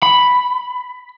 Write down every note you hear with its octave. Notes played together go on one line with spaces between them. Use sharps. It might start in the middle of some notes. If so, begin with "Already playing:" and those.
B5